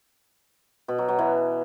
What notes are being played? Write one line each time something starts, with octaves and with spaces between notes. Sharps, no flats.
B2
F#3
F#3
E3